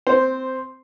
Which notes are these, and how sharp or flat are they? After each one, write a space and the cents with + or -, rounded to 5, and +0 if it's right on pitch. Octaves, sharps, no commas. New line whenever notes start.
C4 -10 C5 +0